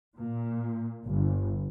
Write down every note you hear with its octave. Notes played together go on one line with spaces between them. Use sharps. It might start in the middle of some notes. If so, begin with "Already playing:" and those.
A#2
G1